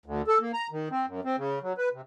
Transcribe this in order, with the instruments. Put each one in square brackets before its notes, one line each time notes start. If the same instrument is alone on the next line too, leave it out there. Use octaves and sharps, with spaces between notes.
[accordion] D2
A4
A#3
A#5
D#3
C4
F#2
C4
C#3
F#3
B4
C3